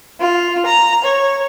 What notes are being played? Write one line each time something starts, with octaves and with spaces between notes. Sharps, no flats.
F4
A#5
C#5